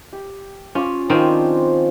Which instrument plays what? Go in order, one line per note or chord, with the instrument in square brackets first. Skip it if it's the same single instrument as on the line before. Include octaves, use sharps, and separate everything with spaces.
[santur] G4
[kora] C#4 [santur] F4 D6
[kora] D#3 C4 C#4 [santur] F3 C5 B5
[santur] D4